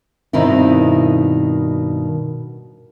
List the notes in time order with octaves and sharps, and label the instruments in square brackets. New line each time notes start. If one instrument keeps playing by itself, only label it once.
[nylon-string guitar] G2 B2 D#3 C4 D#4 E4